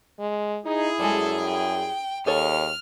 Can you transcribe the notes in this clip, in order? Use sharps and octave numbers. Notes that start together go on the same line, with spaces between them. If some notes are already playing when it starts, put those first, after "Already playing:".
G#3
D#4 E4 G#4
F#2 G3 G#3 A4
G5
D#2 G#4 A4 C#5 F6